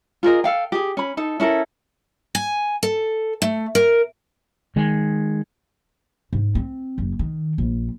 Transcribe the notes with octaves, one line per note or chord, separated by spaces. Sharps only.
F4 G#4 A#4 D#5
A4 F5 G5
G4 G#4
C#4 B5
D#4 A4
C#4 E4 A4 A#4
G#5
A4
A3
A#4
D#3 G#3
G#2
C4
F#1
D#3
A#1